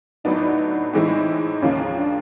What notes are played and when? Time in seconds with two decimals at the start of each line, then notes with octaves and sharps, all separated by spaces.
0.24 A2 F#3 B3 D4 D#4
0.93 A2 E3 G#3 C4 D#4 E4
1.62 D#2 C#3 F3 A#3 C#4
1.97 D4